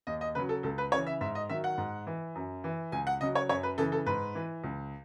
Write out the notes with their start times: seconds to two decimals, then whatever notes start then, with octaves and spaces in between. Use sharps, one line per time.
0.07 D#2 D#5
0.21 D#5
0.35 C#3 F#3 B4
0.49 A4
0.63 C#2 A4
0.78 B4
0.92 C#3 E3 C#5
1.07 E5
1.21 G#2 E5
1.35 D#5
1.49 D#3 F#3 E5
1.64 F#5
1.78 G#2
2.07 E3
2.35 F#2
2.64 E3
2.92 C#2 G#5
3.07 F#5
3.21 C#3 F#3 D#5
3.35 C#5
3.49 F#2 C#5
3.63 B4
3.78 C#3 E3 A4
3.92 A4
4.06 G#2 B4
4.35 E3
4.64 C#2